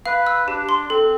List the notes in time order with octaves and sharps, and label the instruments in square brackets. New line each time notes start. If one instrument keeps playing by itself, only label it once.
[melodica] B4 [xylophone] F5
[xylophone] E6
[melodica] D4 [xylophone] G4
[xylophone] C6
[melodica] C4 [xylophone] A4